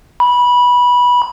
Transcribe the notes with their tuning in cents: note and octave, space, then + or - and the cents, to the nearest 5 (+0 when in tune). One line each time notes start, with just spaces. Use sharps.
B5 -15